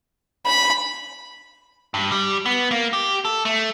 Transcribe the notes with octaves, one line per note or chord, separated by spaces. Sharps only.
B5
G2
G3
B3
A#3
G4
A4
A3